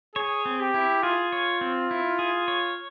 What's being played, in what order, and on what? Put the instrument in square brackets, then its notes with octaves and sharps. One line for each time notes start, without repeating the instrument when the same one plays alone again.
[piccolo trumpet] G#4 [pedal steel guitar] C#5
[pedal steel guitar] C4
[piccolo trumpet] G4
[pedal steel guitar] E4
[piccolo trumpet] F4 [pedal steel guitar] G#4
[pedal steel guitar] C#5
C4
E4
G#4
C#5